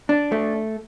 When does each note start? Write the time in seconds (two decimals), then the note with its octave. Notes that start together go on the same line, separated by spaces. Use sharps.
0.09 D4
0.32 A3